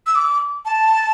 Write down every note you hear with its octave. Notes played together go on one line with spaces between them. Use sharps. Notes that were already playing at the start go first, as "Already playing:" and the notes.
E6
D6
A5